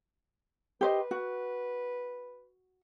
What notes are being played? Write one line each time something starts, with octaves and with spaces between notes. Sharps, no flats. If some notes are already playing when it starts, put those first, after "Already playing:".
G4 B4 C5 D#5
F#4